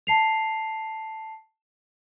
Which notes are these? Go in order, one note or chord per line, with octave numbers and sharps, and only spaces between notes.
A5 C7 F7